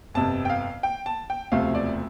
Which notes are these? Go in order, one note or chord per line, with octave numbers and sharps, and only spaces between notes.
G1 F2 C3 A5
G5
F5
G5
A5
G5
E1 D2 C3 F3 A3 F5
D5